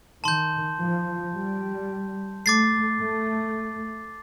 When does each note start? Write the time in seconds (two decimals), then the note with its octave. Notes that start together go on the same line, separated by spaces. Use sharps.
0.24 D#3 A5 C6 G6
0.79 F3
1.35 G3
2.46 A3 D6 A6 C7
3.02 A3